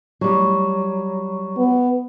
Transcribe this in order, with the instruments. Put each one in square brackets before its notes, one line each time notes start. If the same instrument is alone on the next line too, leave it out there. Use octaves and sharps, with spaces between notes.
[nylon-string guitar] F#3 G3
[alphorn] B3